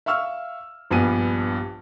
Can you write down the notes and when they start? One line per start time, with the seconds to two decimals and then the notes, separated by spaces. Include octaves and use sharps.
0.06 E5 F5 C#6 E6 F6
0.91 A#1 G2 G3 B3 G#5 D#7